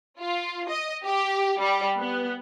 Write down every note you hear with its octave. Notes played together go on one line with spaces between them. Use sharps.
F4
D#5
G4
G3
B3